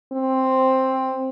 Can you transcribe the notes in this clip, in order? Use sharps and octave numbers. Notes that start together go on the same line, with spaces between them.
C4